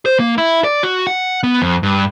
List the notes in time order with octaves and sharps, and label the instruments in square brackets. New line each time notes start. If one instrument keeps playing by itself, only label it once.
[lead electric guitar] C5
A#3
E4
D5
F#4
F#5
B3
F2
G2